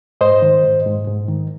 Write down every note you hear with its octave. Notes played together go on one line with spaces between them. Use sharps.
G#2 C5 D#5
D#3
G#2
G#2
G#2
D#3